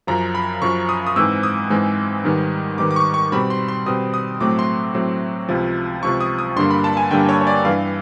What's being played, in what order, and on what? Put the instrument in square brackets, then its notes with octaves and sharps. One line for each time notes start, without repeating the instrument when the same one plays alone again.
[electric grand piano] F#2 C#3 F3 A#5
B5
F#2 C#3 F3 C#6
D#6
D#6
G#2 E3 G#3 C4 E6
D#6
G#2 E3 G#3 C4
G#2 D#3 G3 B3
G#2 D#3 G3 B3 D6
D6
C#6
C#6
B2 G3 C4 B5
C6
C6
B2 G3 C4 D#6
D#6
A2 F#3 A3 C4 D6
C6
A2 F#3 A3 C4
C#2 C3 F3
C#2 C3 F3 C#6
D#6
D#6
G2 D3 G3 A#3 C6
B5
A5
G#5
G2 D3 G3 A#3 G5
C#5
C#5
D5
G2 E3 G3 F5